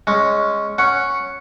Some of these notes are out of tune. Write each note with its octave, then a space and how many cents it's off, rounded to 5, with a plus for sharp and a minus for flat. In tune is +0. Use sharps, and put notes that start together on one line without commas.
G#3 +0 C#4 +0
C#4 -5 F#5 +0